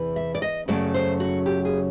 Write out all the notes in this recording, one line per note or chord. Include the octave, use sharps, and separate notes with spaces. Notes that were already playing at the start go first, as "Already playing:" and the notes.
Already playing: E2 C3 E3
E5
D5
D#5
F#2 C#3 F#3 A3 D5
C5
F#4
G4
G#4